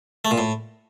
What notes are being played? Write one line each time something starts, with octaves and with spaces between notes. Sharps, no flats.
A3
A#2
A2